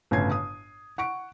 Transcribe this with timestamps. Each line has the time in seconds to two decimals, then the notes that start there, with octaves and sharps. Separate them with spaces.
0.11 G1 A2 C#3 G#5 G#6 C7
0.32 D#6
0.98 F#5 C#6 D7